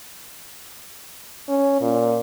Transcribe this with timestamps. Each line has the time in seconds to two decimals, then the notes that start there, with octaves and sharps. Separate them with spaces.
1.49 C#4
1.81 A#2